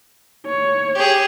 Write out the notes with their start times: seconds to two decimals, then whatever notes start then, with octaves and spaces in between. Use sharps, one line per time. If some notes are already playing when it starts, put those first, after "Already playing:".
0.46 C#5
0.95 G4 G#4